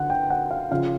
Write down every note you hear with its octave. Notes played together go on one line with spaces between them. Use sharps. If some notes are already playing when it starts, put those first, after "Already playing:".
Already playing: D3 F#5
G5
F#5
F5
C#3 F3 F5